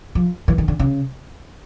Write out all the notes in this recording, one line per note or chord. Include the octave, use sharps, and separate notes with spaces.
F3
E3
D#3
D3
C#3